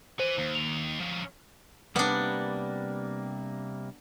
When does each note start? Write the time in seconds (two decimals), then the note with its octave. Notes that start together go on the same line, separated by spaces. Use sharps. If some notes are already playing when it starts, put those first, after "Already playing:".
0.19 B4 C5 G#5
0.38 D#2
0.55 F7
1.00 F3 C#4
1.96 C3 G3 A#3 B3 D4